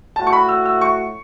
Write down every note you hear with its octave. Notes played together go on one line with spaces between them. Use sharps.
A2 A3 F#4 A5
C#6
B5
E6
E6
C#6